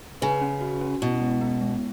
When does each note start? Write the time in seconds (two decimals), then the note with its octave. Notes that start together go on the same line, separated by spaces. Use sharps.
0.22 C#3 B4
0.41 C#4
0.61 F#4
0.81 C#4
1.02 B2 E4
1.21 G#3
1.41 B3
1.61 G#3